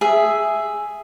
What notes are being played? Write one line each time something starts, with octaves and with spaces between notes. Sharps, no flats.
G#4 E5